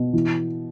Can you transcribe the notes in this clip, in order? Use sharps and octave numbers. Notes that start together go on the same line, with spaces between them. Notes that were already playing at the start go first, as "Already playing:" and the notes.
Already playing: B2
E3